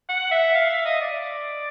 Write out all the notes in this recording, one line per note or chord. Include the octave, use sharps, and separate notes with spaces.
F#5
E5
F5
E5
D#5
D5